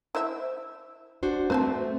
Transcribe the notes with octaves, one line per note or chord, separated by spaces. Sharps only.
E4 C5 E5
D4 F#4 C5
A3 C4 B4 C5 A5